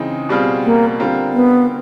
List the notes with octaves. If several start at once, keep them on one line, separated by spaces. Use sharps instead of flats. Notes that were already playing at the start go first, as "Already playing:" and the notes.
Already playing: C#3 E3 G#3 C4 D#4
B2 G3 C4 F4 G#4
A#3
D3 G3 C4 F4 A#4
B3